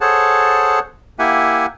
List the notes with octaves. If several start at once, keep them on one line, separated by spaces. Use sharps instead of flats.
G#4 A4 C5 C#5 F#5 A5
A#3 E4 G4 E5 F#5 G#5